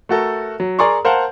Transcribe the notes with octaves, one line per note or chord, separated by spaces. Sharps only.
A3 F#4 A4 A#4
F#3
G#4 A#4 D5 A#5 C6 C#6
A#4 C5 F5 F#5 A5